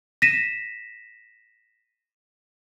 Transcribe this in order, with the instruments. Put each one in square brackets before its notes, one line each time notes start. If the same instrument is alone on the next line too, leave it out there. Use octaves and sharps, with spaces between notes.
[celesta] A#6 B6 D#7 E7